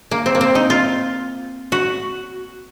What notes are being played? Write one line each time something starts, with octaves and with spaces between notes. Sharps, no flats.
A#3
C4
A#3
C4
D#4
F4
F#4